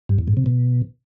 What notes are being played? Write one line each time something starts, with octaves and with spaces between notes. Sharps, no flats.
G2
E2
G#2
C3
B2